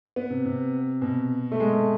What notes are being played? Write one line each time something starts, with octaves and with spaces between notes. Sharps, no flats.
B3
C3
C3
B2
A3
G#3
A3